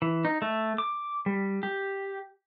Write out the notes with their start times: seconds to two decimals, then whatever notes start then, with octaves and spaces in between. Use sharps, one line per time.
0.02 E3
0.25 D#4
0.42 A3
0.78 D6
1.26 G3
1.63 G4